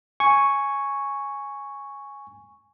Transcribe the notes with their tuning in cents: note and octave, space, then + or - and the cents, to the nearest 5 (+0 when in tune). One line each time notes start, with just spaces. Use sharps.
G#5 +0 C#6 +0